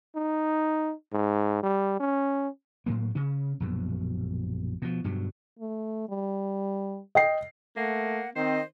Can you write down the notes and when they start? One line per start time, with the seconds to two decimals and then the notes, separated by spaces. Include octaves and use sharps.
0.15 D#4
1.13 G#2
1.63 G3
2.00 C#4
2.86 A2 F#3 A#3
3.15 C#3 C#4
3.60 A#1 F#2 B2
4.82 B2 F3
5.04 G2 B2 F#3
5.59 A3
6.09 G3
7.15 D#5 G5 C7
7.77 A3 A#3 F#5
8.36 D#3 C4 C5 D#5